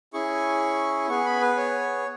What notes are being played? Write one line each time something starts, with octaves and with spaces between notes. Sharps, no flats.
C#4 E4 G#4 C#6
B3 G#4 C#6
B5
B4
C#5